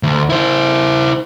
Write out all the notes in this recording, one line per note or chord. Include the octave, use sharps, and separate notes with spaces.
D2
E4 C5